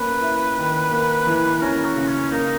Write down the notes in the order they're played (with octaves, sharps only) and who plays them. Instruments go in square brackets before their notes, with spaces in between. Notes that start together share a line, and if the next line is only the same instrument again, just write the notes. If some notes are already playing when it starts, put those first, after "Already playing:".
Already playing: [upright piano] A#3 C#4 [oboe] B4
[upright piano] E4
D#3
A#3
E3
[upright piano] C#4 [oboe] A#4
[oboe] F#4
[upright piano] C#3
[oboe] C#4
[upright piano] A#3 [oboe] D#4